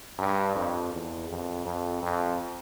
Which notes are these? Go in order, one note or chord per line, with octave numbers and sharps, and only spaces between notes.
G2
F2
E2
F2
F2
F2